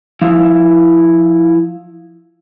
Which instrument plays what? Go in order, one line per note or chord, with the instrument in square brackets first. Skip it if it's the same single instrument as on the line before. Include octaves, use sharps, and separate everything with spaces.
[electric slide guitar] F3 E4 F5